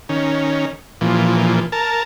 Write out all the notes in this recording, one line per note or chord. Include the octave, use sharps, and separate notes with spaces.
D#3 C#4
A#2 E3 F3
A#4 A5